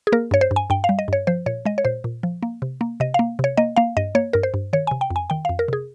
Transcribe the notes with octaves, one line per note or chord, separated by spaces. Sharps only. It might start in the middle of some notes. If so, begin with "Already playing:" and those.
G#4
A#3 A#4
G2 C#5
C5
G2
G#5
G2 G5
F5
G3
D#5
G2 C#5
F3 C5
A#2 C#5
G#3 D#5
C#5
A#2 C5
A#2
F3
A#3
C3
A#3
C3 D#5
A#3 F5
C3 C#5
A#3 D#5
A#3 F5
G2 D#5
A#3 C#5
G2 A#4
C5
G2
D#3 C#5
C3 G#5
G5
F2
G#5
D#3 G5
F2 F5
A#4
C3 G#4